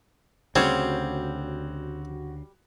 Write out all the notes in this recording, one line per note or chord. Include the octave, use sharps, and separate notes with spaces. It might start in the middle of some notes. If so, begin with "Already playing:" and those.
D2 C#3 G3 C4 F#4 C5 C#5 G#6